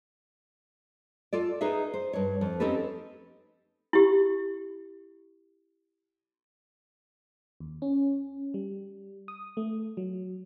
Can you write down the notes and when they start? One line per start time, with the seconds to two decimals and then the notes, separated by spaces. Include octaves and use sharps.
1.33 F4 A4 D5
1.61 D#4 G#4 B4 E5
1.94 C5
2.13 G2 C#5
2.41 F2
2.60 C4 C#4 D#4 G4 A4 B4
3.93 E4 G4
7.60 D#2
7.82 C#4
8.54 G3
9.28 D#6
9.57 A3
9.97 F#3